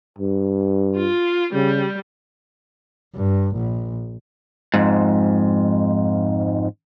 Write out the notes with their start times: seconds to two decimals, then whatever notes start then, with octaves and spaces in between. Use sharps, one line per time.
0.18 G2
0.97 F4
1.54 C#3 G3
3.15 G2
3.56 A#1
4.74 F2 G#2